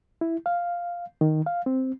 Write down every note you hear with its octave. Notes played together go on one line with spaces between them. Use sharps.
E4
F5
D#3
F5
C4